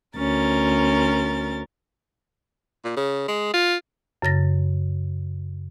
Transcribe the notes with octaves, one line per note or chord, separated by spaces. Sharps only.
D2 C#4 A#4 A6
A#2
C#3
G#3
F4
F#2 C#3 A6 A#6